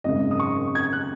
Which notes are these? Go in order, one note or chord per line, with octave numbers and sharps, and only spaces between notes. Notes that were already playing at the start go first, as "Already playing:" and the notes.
G#1 F#2 C#3 G#3 D#5
D#6
C#6
G#6
F#6